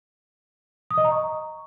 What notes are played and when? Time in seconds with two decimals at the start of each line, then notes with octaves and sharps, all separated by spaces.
0.91 D#6
0.98 D#5
1.05 A#5
1.12 C#6